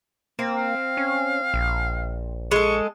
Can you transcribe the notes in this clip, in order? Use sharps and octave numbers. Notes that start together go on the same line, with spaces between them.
A#3 C4
F5
C#4
A#1
G#3 A4 C#6